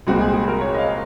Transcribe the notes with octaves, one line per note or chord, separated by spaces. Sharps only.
C2 A#2 G#3 C4 F#4
G#4
G#4
A#4
C#5
D#5
F5